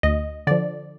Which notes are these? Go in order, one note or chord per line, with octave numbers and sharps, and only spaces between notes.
D2 D#5
D3 F3 D5